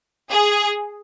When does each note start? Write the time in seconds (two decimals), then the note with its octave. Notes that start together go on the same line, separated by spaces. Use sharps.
0.30 G#4